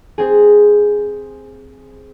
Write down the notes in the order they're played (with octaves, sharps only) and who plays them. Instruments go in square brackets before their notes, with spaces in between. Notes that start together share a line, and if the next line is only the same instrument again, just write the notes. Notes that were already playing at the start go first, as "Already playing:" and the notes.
[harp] C4 G#4